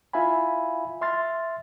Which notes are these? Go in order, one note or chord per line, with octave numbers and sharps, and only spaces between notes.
E4 F4 E5 F5 G#5 B5
E5 C6 F6 A6